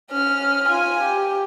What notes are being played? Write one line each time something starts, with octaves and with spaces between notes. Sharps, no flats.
C#4 F6
F4 G#5
G4